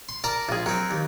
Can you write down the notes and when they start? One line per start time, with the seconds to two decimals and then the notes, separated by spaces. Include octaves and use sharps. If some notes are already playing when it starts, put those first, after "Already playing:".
0.09 C6
0.24 A#4 D5 A5 A#5
0.49 A#1 F4 G#4
0.66 F#3 C4 A#4
0.91 D#2